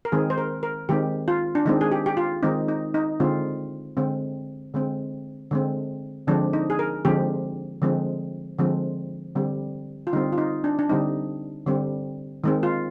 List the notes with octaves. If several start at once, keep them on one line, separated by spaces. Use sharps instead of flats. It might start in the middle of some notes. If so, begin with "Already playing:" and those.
A#4
D#3 G#3 C4 G#4
C5
A#4
A#4
D#3 G#3 C4 G4
F4
D4
D#3 G#3 C4 D#4
G#4
G4
G4
F4
D#3 G#3 C4 D#4
D#4
D#4
D3 G#3 C4 F4
D3 G#3 C4
D3 G#3 C4
D3 G#3 C4
D3 F3 G#3 C4 D4
D#4
G#4
A#4
D3 F3 G#3 C4 G4
D3 F3 G#3 C4
D3 F3 G#3 C4
D3 G3 C4
F4
D3 G3 C4 D#4
F4
D#4
D4
D4
D3 G3 C4 D#4
D3 G3 C4
D#3 G#3 C4
F4